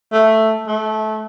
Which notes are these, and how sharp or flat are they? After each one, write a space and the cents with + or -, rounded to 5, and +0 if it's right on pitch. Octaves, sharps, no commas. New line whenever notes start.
A3 +5
A3 -20